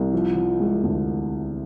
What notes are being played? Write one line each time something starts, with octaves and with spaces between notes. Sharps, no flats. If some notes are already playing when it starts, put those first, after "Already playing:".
Already playing: C2
F3
F3
G#3
D2